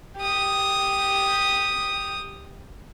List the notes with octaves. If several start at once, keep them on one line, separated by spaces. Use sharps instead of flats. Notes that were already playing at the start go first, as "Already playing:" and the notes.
G4 D#6